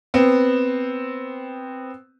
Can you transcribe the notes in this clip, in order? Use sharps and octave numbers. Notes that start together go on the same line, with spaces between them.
B3 C4